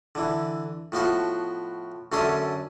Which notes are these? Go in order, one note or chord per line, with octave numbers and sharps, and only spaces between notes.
D3 E3
A2 F3 B3 F#4
F#2 D3 A3 C#4 C6 D#6